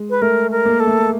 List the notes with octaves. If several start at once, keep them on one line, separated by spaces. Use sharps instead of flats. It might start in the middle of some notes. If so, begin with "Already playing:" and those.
Already playing: G#3
B4
A3 A#4
A#4
A#3
A4
A3